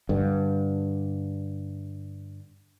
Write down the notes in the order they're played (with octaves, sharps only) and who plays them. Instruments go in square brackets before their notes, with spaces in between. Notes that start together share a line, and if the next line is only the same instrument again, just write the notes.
[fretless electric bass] G2 D3